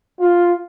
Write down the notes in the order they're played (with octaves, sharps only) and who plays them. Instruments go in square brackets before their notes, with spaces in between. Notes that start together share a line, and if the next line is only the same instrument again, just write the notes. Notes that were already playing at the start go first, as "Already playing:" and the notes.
[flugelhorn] F4